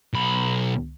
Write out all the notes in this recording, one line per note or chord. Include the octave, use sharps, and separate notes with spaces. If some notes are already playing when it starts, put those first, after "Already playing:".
B1 B5